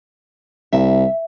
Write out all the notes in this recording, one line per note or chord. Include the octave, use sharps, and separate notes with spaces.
C2 E5